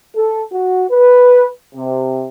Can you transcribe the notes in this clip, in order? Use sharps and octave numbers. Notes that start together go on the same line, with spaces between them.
A4
F#4
B4
C3